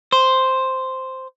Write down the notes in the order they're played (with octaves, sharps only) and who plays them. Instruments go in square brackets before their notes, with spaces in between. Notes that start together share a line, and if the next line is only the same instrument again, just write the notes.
[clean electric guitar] C5